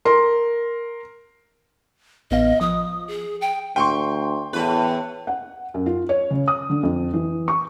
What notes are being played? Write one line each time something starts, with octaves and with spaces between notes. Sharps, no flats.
A#4 C6
A1 B3 D#5 F5
F3 D#6
G#4
G5
D2 G5 C6 C#6
E2 A2 B4
F#5
F#2
F4
C#5
C#3
D#6
D3
F2
E3
C#6